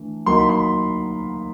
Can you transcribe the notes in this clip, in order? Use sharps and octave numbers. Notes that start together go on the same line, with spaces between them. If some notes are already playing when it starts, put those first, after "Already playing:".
Already playing: E3 A3 D4
F#3 A#3 D#4 C6
B5
C6